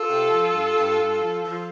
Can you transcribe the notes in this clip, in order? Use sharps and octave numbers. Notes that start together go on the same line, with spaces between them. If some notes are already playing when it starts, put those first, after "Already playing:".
Already playing: F4 A4
C3
F3
G2
G2
G2
F3
F3